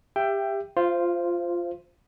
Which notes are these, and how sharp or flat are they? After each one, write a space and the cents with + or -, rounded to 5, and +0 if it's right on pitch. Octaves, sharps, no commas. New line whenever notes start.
G4 +20 E5 +20 G5 +0
F4 +0 C5 -5 F5 -30